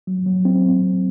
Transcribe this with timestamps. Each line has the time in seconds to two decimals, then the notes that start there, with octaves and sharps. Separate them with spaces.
0.07 F#3
0.26 F#3
0.45 C4